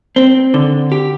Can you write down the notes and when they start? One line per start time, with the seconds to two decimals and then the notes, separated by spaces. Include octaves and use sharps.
0.16 C4
0.54 D3
0.92 G4